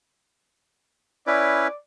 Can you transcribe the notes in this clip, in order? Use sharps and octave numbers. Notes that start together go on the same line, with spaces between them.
C#4 E4 B4 D5